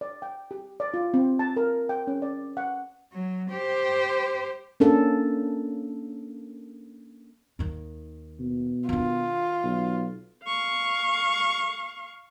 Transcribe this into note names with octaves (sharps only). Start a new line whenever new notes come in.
D5
G5
G4
D5
F4
C4
A5
A#4
G5
C#4
D5
F#5
F#3
G4 C5
A#3 C#4 D4 A4
D#2 D#3
B2
D#3 D4 F4
B1
F5 C#6